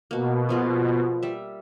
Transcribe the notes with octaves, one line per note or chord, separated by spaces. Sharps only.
B2 A#3 F#4
F3 F4 G#4
G3 E5